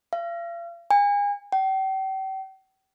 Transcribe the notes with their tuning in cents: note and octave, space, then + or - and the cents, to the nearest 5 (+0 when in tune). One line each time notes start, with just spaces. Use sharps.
F5 -40
G#5 -35
G5 -40